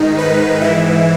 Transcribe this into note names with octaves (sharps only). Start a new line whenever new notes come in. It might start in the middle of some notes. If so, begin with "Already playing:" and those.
Already playing: G#2 D#3 D#4
B4
G#2 E3 E4